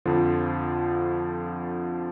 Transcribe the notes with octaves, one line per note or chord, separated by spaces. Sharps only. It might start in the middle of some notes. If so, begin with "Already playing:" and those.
F2 D3 F3